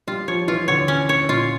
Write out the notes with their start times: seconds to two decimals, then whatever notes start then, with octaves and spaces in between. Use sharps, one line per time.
0.07 G3 F4
0.28 F3 C#5
0.48 E3 F4
0.68 D3 C#5
0.88 C#4
1.09 C#5
1.29 A#2 F4